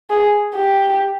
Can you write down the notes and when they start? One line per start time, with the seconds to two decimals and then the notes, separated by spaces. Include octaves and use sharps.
0.10 G#4
0.55 G4